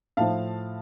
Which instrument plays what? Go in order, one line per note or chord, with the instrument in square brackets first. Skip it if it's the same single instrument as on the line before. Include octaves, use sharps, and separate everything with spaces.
[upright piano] A2 F3 F5 A5